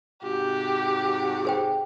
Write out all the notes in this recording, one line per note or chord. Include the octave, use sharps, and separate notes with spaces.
G#2 C3 F#4 G4
G#4 C5 G5